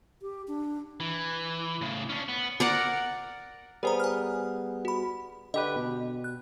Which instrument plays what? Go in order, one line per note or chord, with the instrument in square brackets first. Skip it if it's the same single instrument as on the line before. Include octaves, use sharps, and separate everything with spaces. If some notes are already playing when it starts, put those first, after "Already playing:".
[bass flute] G4
D4
[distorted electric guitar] E3
A2 C#3
C#4 D4
B3
[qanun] A#4 D5 F#5
[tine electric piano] G3 B3 G#4 [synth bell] A#4 C5 A#5
[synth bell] G#5 F6
F#4 B5
[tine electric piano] D3 G4 B4 [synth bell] D#5
[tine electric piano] B2
[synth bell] F#6